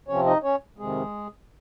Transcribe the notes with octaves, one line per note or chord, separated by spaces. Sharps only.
C3 F3 C4 C#4 C#5
D#4 D#5
C#4 C#5
F2 C3 D#3 G#3 G#4